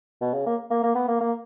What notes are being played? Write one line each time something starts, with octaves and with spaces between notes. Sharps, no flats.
B2
C#3
A#3
A#3
A#3
B3
A#3
A#3